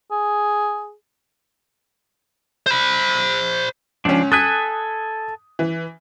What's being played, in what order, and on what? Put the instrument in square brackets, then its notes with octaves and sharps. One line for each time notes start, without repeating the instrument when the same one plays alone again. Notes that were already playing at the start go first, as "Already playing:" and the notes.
[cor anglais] G#4
[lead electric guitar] C5 B5
[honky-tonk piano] C#2 C#4 [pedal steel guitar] F3 D4
[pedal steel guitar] A4 G#5 [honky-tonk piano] D#6 F#6 B6
[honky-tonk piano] E3